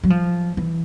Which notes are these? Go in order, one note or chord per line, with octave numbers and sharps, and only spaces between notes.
F#3
F3
E3